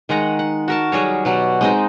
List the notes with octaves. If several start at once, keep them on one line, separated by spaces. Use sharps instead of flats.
D#3 G#3 F#5 A#5
F#5
F#4 A#4 A5
F#3 G3 G#4 C#5
B2 F#3 G3
G#3 C4 D#4